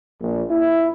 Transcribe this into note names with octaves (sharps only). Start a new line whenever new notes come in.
A#1
E4